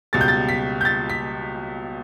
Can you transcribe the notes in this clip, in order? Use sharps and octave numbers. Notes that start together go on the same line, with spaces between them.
C#2 B2 G3 A6
G6
A6
B6
G6
A6
B6